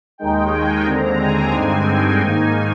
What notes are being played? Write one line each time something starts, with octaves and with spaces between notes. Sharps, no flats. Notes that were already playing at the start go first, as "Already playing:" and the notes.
D#2 D#3 G#3 D#4 G5
G#5
D#2 D3 G#3 C4 A#5
G#5
G2 D3 G#3 C4 D#4 G#5
G5
G#2 D#3 A#3 D#4 G#5